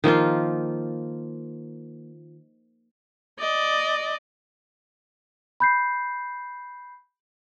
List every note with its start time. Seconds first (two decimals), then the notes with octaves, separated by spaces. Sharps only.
0.04 D#3 F3 A#3 F4
3.39 D5 D#5
5.60 B5 G6 C7